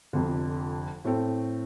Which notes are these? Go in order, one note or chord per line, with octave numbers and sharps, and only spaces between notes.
F1 F2 D3
A2 A3 C4 A4